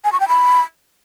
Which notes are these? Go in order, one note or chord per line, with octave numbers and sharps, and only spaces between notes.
G#5
C#6
G5
B5